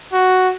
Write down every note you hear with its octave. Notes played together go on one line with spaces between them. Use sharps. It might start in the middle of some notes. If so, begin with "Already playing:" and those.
F#4